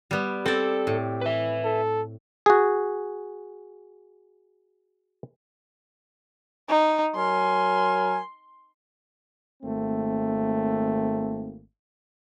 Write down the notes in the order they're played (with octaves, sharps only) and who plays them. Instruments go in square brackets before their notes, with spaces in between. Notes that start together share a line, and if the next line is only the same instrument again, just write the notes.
[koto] G3 B3
[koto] C4 D5 [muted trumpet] G4 [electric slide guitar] A4
[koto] A2
[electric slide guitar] B4 E5
[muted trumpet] A4
[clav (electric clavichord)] F#4 G#4
[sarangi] D#4
[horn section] F#3 A#4 G#5 [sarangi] C6
[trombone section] G#1 A3 A#3 C4